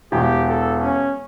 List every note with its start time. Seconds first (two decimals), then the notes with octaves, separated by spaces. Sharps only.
0.12 E1 G4
0.49 A4
0.81 C#4